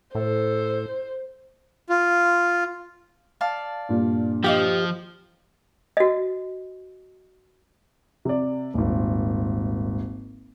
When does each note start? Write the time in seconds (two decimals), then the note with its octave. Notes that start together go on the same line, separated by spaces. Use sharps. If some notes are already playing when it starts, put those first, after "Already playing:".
0.15 A2 A4 C5
1.89 F4
3.41 D5 F5 A5
3.89 G2 A#2
4.44 F3 G4 D#5 F5 G5
5.97 F#4 D#5
8.25 C3 D5
8.74 D#1 G#1